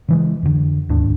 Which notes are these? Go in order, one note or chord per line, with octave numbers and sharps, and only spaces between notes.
C#3 E3 G#3
F2 D3
D1 D#2 G#2 D4